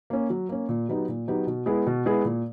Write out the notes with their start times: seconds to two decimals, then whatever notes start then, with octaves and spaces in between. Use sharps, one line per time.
0.10 A#3 C#4
0.30 F#3
0.49 A#3 C#4
0.69 A#2
0.89 F#3 B3 D#4 G4
1.08 A#2
1.28 F#3 B3 D#4 G4
1.47 B2
1.66 G#3 B3 E4 G#4
1.86 B2
2.06 G#3 B3 E4 G#4
2.25 A#2